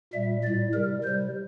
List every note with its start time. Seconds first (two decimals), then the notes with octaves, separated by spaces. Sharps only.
0.13 A#2 G3 E5
0.44 A2 G3 D5
0.73 C3 G3 A#4
1.04 C3 G3 C5